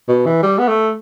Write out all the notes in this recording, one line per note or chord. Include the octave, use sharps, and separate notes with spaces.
B2
E3
G3
B3
A3